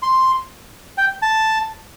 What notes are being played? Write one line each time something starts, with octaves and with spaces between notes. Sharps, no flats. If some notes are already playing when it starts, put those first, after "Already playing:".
C6
G5
A5